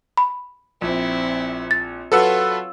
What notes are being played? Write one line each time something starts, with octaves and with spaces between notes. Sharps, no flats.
B5
A#1 C4 E4
A6
F#3 F4 A4 B4 C#5 F#5 E6